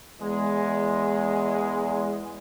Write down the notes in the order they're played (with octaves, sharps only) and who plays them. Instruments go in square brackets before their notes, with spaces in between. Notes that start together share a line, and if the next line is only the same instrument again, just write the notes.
[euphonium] E2 [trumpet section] G#3